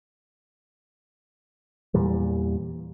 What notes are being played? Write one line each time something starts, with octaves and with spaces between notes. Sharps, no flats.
E2 A#2 E3 G3